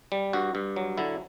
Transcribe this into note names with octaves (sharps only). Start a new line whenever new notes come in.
G3
G2 F#4
G2
F#3
D3 E4